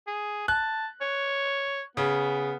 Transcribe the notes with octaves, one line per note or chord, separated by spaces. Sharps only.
G#4
A5 F#6
C#5
C#3 B3